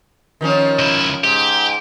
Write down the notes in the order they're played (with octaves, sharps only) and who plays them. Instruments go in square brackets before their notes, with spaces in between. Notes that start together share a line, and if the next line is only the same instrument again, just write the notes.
[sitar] D#3 F3 C#4
[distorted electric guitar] C#2 E4
[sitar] G#2 [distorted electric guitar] G4